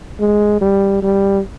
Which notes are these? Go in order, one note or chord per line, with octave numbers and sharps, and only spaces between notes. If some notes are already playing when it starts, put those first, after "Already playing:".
G#3
G3
G3